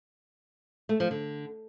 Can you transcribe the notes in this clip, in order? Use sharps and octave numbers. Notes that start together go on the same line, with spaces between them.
A3
F3
D3